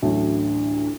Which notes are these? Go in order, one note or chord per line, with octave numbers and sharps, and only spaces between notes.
A1 D2 D3 F#3 A3